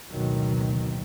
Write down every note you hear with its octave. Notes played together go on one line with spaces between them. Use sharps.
F#1 D2 B2 D#3 F#3